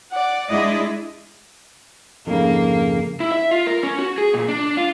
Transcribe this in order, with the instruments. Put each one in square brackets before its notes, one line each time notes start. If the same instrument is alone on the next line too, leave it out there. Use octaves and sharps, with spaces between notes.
[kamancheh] D5 F#5
[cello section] G#3 D4 E4 [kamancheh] D5 D#5
[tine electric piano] F2 G#2 C#3 [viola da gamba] A#3
[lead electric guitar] E4
E5
F4
A#4
C#4
F#4
G#4
A#2
D4
F4